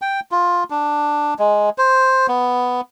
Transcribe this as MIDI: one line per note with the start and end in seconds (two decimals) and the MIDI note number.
0.02 0.20 79
0.31 0.64 65
0.70 1.34 62
1.39 1.70 56
1.78 2.27 72
2.28 2.81 59